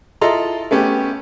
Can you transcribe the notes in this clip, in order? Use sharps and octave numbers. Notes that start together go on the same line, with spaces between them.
E4 F4 A4 D#5 A#5 C6
A3 B3 C#4 G4